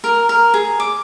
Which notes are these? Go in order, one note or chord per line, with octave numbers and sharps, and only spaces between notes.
A#4
A#4
G#4
D6